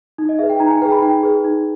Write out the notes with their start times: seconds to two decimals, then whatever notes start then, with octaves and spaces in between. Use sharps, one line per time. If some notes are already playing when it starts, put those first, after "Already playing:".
0.18 D#4
0.29 D#5
0.39 G#4 B4 E5
0.50 G5
0.60 D#4 A#5
0.70 G#5
0.82 G#4 B4 G5
0.92 B5
1.02 D#4 G5
1.23 G#4 B4
1.44 D#4